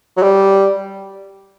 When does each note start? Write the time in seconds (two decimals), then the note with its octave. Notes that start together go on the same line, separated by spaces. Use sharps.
0.17 F#3
0.23 G3